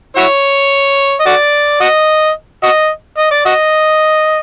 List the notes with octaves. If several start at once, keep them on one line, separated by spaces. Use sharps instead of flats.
E4 F#4 C#5
D#5
F#4 D5
F#4 D#5
F#4 D#5
D#5
D5
F#4 D#5